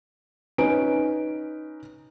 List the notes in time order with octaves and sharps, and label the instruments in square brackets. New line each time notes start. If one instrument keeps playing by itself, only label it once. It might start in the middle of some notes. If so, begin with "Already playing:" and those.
[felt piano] C#4 D#4 B4 D7